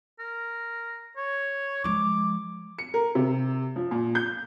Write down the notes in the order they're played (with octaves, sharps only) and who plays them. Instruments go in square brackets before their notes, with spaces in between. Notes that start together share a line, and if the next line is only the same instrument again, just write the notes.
[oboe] A#4
C#5
[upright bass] F3 G#3 [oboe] D6
[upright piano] C#7
A#4
C3
F3
A#2
G6